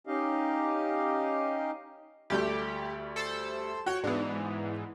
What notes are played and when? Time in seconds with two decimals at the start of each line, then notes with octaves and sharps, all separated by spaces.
0.07 C#4 D#4 G4 D#5 F5
2.30 D2 G3 A3 G4
3.16 A4 C5 E6
3.86 F#4 C#5 G5
4.04 G#2 E3 B3 D4